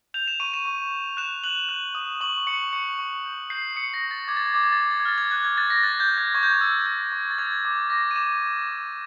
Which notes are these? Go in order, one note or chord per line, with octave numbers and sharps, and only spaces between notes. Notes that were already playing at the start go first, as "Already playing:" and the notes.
G6 F7
E7
C#6 D#7
E7
C#6
C#6
F#6 E7
F#6 F#7
F#6
D#6
C#6 F#7
C#6 C#7
C#6 C#7
C#6
G6
G6 C7
D#6 C#7
A#6
G6
A6
D6 G#6
A6
G#6
D6 A6
G#6
A6
D6 G#6
A6
G#6
F6 A6
G#6
F#6 G#6
G#6
F#6 A6
A#6
F#6 A6
G6
F#6
G#6
C#6 G#6
G6
G#6
E6
G6
C#6
A6
F6 G#6
D6
D6 A#6
D#7
D6 E7
D6
D6